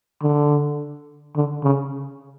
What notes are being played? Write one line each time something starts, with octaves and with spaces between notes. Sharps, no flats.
D3
D3
C#3